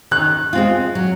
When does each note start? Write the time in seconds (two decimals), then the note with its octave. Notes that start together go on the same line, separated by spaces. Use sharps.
0.11 D#3 F#6
0.53 G#3 C4 F4
0.95 F#3